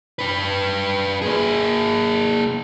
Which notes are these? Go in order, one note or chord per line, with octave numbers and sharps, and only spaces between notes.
D4 B4
A#3 G#4